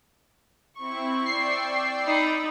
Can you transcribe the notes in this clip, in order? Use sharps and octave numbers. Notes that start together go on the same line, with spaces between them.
C4 E4 C#6
D5 G5 E6 C7
D#4 B5